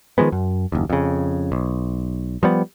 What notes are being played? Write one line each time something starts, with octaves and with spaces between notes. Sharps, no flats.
D#3 F3 G#3 B3
F#2
F#1 D#2
F2 C#3
B1
F3 G3 B3